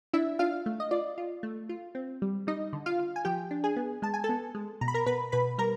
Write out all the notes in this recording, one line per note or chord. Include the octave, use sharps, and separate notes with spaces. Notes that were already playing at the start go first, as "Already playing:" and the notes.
D4 E4 E5
D4 F4 F5
A3
D#5
F4 D5
F4
A3
F4
C4
G3
G3 D#4 D#5
D3
F4 F5
F4
G#5
F3 G4 G5
D4
G#4 G#5
B3
G#3 A5
G#5
A4 A5
B3
G#3
B2 A#5
B5
A#4 A#5
B2 B4 B5
B2 B4 B5
G3 A#4 A#5